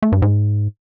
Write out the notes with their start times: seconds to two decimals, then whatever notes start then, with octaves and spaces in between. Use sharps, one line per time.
0.02 A3
0.12 G2
0.22 G#2